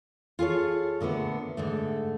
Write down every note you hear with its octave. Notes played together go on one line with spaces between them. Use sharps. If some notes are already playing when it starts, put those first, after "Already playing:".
F4 G#4 A4 C#5
A#2 D3 A3 B3
G#2 D3 A3